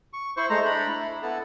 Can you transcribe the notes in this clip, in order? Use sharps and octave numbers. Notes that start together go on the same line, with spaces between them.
C#6
E4 C5 C#6
G#3 A3 C5 A#5
D4 A#5 B5
E4
B3 E4 A4